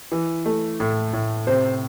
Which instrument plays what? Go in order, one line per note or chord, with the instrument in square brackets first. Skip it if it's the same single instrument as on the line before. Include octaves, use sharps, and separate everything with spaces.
[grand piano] E3
A3
A2
A2
[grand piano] C3 [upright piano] C5